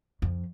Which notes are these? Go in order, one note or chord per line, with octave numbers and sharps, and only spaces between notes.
F2